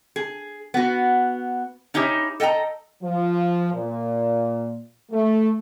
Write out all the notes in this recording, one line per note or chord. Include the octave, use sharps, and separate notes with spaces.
G#4
B3 F#4
C#4 D#4 E4 G4 C#5
A4 D#5 G5 A5 A#5
F3
A#2
A3